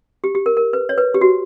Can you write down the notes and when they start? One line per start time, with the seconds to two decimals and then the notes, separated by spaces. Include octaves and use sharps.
0.24 G4
0.35 G4
0.46 A#4
0.57 A#4
0.73 B4
0.89 C#5
0.98 B4
1.14 G4
1.21 F#4